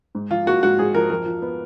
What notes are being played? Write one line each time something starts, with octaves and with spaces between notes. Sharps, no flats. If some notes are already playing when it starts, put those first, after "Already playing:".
G#2
F3 F4
A#3 F#4
G#2 F#4
G#2 G#4
F3 A#4
F2 A#4
F3
B3